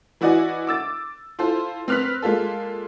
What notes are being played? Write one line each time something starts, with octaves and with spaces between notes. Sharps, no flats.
E3 E4 F#4 D5 D#5 G#5
D6 E6 A6
E4 F4 A4 C5
C4 B4 F6 F#6 B6
G#3 A#3 F4 A4